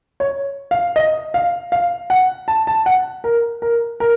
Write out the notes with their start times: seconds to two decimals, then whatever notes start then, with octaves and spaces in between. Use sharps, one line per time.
0.20 C#5
0.71 F5
0.96 D#5
1.34 F5
1.72 F5
2.10 F#5
2.48 A5
2.67 A5
2.86 F#5
3.24 A#4
3.62 A#4
4.00 A#4